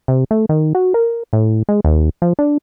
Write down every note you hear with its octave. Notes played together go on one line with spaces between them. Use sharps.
C3
A3
D#3
F#4
A#4
A2
G#3
D#2
F3
D4